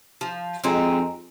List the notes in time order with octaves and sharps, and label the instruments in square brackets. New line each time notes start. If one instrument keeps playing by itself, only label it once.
[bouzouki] F3
[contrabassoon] F2 [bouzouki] G#3 C4 D#4